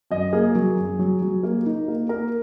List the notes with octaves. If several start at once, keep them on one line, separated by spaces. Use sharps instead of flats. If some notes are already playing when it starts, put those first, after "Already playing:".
F#2 D#5
A#3 G#4
F#3
F#2
F#3
F#3
A#3
D#4
A#3
A#3 A#4